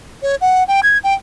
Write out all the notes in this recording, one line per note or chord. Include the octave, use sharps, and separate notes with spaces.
C#5
F#5
G5
G#6
G5